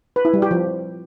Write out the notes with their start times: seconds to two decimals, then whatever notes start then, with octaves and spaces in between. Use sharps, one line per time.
0.16 B4
0.25 E4
0.34 G3
0.42 G4
0.51 F3